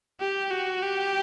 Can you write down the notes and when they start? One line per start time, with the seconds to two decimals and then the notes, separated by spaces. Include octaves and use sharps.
0.20 G4
0.50 F#4
0.82 G4